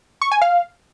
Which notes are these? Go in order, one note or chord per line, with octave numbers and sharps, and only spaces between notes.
C#6
G#5
F5